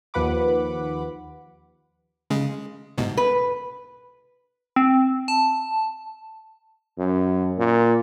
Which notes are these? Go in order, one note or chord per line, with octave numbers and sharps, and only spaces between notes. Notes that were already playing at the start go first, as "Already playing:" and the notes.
D#2 F3 B4 F#5 B5 D6
C#3 G#3
C2 G#2 B2
B4
C4
A5
F#2
A#2